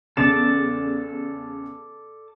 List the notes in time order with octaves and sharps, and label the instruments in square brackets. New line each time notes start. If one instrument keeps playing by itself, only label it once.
[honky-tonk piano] E2 C#3 E7 [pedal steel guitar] A4 D5 A5